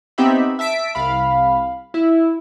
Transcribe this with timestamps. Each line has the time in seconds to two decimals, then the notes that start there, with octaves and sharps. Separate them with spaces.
0.18 B3 C4 D#4 G4 E5 B5
0.59 E5 A5 B6 D7
0.95 C2 F5 B5
1.94 E4